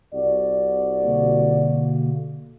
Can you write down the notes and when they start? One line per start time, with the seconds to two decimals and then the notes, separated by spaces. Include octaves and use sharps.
0.14 C2 F#4 D5
1.03 B2 D3 A#3